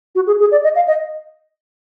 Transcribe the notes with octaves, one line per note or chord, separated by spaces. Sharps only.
F#4
G#4
G#4
D5
D#5
F5
D#5